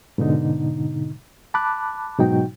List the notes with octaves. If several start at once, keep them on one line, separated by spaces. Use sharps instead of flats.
G#2 B2 D3 D#4
A5 B5 D6 F#6
G#2 B2 F#3 D#4 F#4 G5